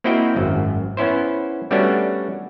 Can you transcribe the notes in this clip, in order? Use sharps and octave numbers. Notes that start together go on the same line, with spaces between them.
A#3 C4 E4 F#4 D#5 G5
G#1 F#2
B3 C#4 E4 C5
G3 A3 B3 C#4 D4 F#4